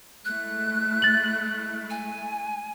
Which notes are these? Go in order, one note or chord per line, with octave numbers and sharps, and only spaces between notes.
G#3 A3 E4 F#6
A6 F#7
G#5